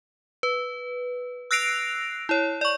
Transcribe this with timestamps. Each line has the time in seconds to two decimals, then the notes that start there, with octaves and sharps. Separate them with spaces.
0.43 B4
1.51 E6 F#6 A#6 C7 D7 F7
2.29 E4 C#5
2.61 D5 C#6